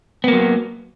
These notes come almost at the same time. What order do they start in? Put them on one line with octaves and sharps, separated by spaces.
B3 A#3 F#3